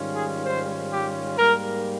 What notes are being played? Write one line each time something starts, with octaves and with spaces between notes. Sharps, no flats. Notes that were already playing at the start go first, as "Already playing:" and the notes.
Already playing: G#2 D#3 G3 C#4 F4
G#4
C5
G4
G#2 G3 A#3 A#4